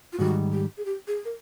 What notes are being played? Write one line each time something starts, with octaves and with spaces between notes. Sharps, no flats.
F4
G#2 D#3 G3 F#4
G4
G#4
G4
G#4
A#4